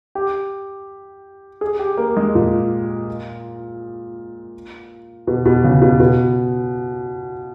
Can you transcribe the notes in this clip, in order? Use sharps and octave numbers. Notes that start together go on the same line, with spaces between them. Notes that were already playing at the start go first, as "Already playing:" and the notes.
G4
G#4
G4
A#3
G#3
A#2
B2
B2
C#3
B2
B2